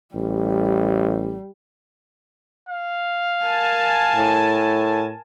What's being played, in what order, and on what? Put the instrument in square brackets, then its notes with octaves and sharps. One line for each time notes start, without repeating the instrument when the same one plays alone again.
[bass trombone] A1 [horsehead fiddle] G3
[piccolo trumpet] F5
[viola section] A#4 G#5 A5
[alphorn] A2